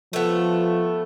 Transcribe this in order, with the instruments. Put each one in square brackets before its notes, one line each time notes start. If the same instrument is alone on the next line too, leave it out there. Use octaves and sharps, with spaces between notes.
[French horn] F3 [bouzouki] A3 B3